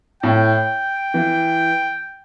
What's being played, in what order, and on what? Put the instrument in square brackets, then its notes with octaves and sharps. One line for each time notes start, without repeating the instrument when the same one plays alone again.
[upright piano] A2 [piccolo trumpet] G5
[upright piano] E3